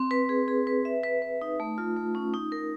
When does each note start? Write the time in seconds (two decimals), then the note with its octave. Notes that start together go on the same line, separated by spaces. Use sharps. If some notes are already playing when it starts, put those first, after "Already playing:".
Already playing: C4
0.11 B4
0.29 G#4
0.48 G#4
0.67 B4
0.85 E5
1.04 B4
1.22 B4
1.41 D#4
1.60 A3
1.78 F4
1.96 A3
2.15 C#4
2.34 D#4
2.52 A#4